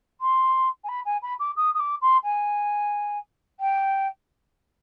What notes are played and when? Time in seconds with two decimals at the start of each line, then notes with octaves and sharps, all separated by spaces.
0.21 C6
0.84 G#5
0.88 B5
1.05 G#5
1.22 B5
1.40 D6
1.56 D#6
1.74 D#6
1.79 D6
2.02 C6
2.24 G#5
3.60 G5